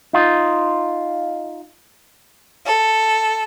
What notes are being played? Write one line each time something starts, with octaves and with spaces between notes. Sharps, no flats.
D#4 F4
A4